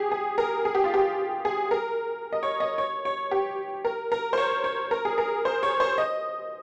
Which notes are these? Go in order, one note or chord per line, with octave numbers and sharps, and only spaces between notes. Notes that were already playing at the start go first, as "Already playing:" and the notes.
Already playing: G4 G#4
G#4
A#4
G#4
G4
F4
G4
G#4
A#4
D#5
C#5
D#5
C#5
C#5
G4
A#4
A#4
C5
C#5
C#5
A#4
G#4
A#4
C5
C#5
C5
D#5